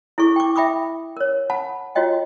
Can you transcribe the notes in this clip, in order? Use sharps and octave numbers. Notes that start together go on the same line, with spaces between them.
E4 G#4 A4 C#6
G5 C#6 D6
E5 G5 B5 D6 D#6
A#4 C#5
F#5 A5 B5
F4 F#4 C#5 D#5 G5